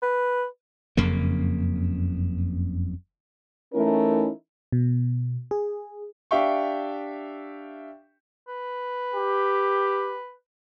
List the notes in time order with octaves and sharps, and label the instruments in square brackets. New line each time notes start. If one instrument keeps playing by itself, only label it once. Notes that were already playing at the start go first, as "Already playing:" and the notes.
[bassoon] B4
[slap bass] F#1 F2 C#3 A#3
[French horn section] E3 A3 C#4 D#4 E4 A#4
[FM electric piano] B2
G#4
[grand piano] D4 G4 E5 F5 G5 C#6
[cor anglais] B4
[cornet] G4